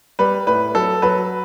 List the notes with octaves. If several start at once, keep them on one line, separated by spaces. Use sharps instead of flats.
G3 B4
A2 B4
F#3 A4
F#3 B4